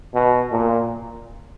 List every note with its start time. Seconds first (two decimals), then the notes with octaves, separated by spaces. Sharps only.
0.14 B2
0.52 A#2